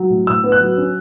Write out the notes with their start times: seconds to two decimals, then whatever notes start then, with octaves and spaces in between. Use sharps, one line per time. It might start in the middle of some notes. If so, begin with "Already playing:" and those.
Already playing: F#3
0.10 A2
0.27 A2 E6
0.44 B3
0.52 F#6
0.60 F#3
0.77 C#4